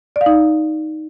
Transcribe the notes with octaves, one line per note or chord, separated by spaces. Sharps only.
D5
F5
D#4